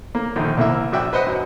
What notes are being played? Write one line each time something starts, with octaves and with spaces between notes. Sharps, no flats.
A#3
A#1 D3 D#3
C2 A#3 E4 E5
A#1 F#4 D5 E5 G5
B4 C5 D#5 F#5
F#2